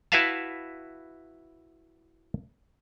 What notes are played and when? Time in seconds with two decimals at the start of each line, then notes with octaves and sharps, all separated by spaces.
0.12 E4 F#4 B4 E5 F5 A5